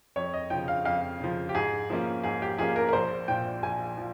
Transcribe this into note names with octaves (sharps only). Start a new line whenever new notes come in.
F2 C#5
D#5
C#3 F3 G5
F5
F2 F5
C#3 F3
G4
G#2 G#4
F3 A#3 C#4
G#2 G#4
G4
F3 A#3 C#4 G#4
A#4
A#4
A#1 C5
A#2 F3 G5
A#1 G#5
F3